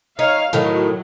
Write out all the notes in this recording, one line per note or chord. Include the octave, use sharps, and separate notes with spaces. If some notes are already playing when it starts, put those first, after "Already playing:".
D#4 C#5 F5
A2 D#3 F#3